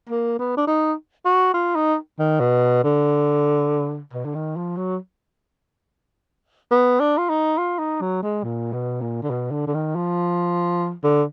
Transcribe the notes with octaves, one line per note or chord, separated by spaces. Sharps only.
A#3
B3
D4
D#4
F#4
F4
D#4
D#3
B2
D3
B2
D3
D#3
F3
F#3
B3
D4
F4
D#4
F4
D#4
F#3
G#3
A#2
B2
A#2
D3
B2
D3
D3
D#3
F3
D3